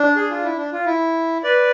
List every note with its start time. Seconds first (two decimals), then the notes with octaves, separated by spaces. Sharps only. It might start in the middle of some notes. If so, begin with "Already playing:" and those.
Already playing: D4
0.16 G#4
0.30 F4
0.44 E4
0.57 D4
0.72 F4
0.86 E4
1.44 B4 D5